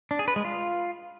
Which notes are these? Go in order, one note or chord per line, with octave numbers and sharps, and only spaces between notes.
D4
G#4
B4
G#3
F4